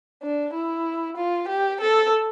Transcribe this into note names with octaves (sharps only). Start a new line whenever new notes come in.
D4
E4
F4
G4
A4